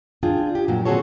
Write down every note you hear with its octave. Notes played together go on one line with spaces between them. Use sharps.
D4 F4 G#4 G5
G4
A#2 F#3
D3 C4 F#4 G#4 A4 C#5